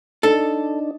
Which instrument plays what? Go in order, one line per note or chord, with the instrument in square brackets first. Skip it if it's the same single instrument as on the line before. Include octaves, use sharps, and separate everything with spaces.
[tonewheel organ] D4 D#4 [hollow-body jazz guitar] A4